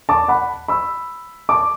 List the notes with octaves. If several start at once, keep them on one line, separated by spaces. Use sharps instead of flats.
A5 D6
F#5 B5
B5 E6
A5 D6